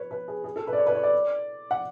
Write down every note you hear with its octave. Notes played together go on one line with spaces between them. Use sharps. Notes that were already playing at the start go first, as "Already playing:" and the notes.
Already playing: B4 C#5
B4
G#4
G#4
A4
B4
D5
C#5
B4
D5
C#5
D5
F#5